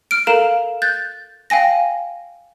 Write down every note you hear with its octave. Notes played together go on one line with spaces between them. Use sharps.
F6 D7
A4 A#4 F5 A#5 E7
F#6 G6 A6
F5 G5 G#5 A#6